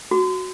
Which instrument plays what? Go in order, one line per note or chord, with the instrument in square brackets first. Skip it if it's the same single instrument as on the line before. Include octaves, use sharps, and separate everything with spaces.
[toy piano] F#4